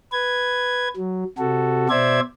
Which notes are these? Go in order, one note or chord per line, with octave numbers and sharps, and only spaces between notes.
B4 G#6
F#3
C3 F#4 A4
B2 C5 D5 E5 G#6